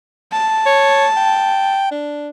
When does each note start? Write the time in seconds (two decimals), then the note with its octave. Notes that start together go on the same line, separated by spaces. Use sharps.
0.32 A5
0.66 C#5
1.17 G5
1.91 D4